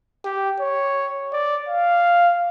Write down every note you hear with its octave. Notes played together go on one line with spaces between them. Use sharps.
G4
C#5
D5
F5